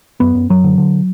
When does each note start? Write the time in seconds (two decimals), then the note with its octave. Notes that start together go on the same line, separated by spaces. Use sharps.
0.20 F#2 B3
0.35 F#2
0.50 F#2 F#3
0.64 D3
0.78 D3